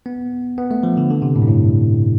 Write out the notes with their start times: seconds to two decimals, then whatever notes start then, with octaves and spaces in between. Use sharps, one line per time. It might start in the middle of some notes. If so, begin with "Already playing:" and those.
0.06 B3
0.58 B3
0.71 A3
0.83 F3
0.97 D3
1.10 D3
1.22 C3
1.36 A2
1.42 G2
1.48 A2